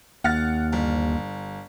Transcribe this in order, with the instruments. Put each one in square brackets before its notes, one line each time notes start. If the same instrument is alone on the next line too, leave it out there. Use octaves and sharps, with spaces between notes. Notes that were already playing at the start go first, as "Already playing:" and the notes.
[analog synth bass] D#2 [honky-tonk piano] F#5 F6 A6
[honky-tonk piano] G1